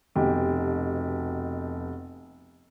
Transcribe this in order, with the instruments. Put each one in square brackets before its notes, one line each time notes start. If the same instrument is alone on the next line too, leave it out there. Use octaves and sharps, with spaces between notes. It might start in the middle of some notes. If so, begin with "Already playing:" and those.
[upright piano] F1 B2 G4